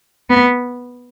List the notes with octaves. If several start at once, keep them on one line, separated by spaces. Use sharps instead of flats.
B3